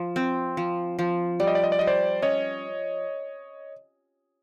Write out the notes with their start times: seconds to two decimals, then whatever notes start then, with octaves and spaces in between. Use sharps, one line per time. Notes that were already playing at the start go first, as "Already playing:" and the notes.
Already playing: F3
0.16 C4
0.57 F3
0.99 F3
1.40 G3 D5
1.47 D#5
1.55 D5
1.64 D#5
1.72 D5
1.79 G3 D#5
1.87 C5 D5
2.22 C#4 C#5 D#5